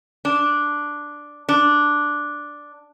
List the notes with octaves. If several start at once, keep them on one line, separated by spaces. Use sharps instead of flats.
D4
D4